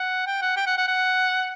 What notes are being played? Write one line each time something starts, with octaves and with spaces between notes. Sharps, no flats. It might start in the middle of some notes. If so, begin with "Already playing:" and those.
Already playing: F#5
G5
F#5
G5
F#5
F#5
F#5